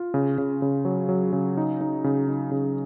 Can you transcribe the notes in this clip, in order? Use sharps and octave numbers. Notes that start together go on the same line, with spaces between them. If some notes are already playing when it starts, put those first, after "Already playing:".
Already playing: F4
C#3
C#3
C#3
F#3
F#3
C#3
D#4
D#4
C#3
D#4
C#3